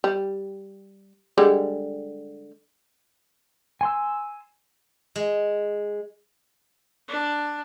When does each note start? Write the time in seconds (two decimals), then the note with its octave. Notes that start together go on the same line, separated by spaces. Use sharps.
0.04 G3
1.38 D3 G3 G#3
3.81 G#5 C6 E6
5.16 G#3
7.09 D4